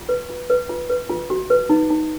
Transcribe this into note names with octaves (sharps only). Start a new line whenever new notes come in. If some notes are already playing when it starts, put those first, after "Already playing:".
Already playing: F4
B4
F4
B4
F4
B4
F4
F#4
B4
D#4
D#4